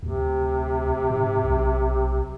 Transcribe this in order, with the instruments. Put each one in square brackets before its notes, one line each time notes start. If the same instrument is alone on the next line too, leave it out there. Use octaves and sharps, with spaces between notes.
[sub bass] D2 [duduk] C3
[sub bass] G#2
B1